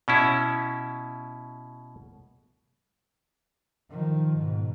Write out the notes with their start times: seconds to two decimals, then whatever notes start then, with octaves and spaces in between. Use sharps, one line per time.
0.08 B2 C#4 E4
3.91 D#3 F3
4.37 G#2 B2